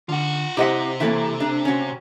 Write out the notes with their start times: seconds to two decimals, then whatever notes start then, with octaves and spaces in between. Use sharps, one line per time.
0.09 D3 F4 F#5
0.57 C3 E4 G4 C5 D#5 E5 F#5
1.00 E3 A#3 E4 A4 E5
1.40 D4
1.65 C#4 F#4